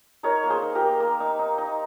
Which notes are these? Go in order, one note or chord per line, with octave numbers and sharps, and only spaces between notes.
D#4 A#4 C#5
A#3
G#4 C5
D#4
G4 A#4
A#3
A#3
D#4
D#4
D#4